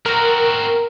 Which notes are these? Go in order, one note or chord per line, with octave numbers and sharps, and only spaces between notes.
C4 F#4 A#4